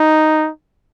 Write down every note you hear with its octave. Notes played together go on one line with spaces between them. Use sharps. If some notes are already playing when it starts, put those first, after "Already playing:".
Already playing: D#4